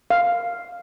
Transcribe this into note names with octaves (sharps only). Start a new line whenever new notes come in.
F5